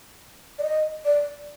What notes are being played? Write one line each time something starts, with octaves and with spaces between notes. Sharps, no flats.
D5
D#5
D5